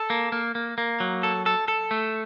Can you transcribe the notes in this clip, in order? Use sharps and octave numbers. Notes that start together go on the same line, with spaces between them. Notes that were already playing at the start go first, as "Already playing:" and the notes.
Already playing: A4
A#3
A#3
A#3
A#3
F#3
A4
A4
A4
A3